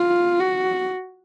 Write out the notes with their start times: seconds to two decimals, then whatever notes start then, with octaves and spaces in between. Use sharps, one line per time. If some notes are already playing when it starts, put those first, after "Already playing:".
Already playing: F4
0.39 F#4